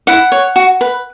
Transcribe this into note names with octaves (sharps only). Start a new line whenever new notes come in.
E4 F#5
C#5
F#4
B4